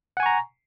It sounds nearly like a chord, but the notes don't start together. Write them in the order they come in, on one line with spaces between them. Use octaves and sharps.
F#5 G#5 C#6 A#5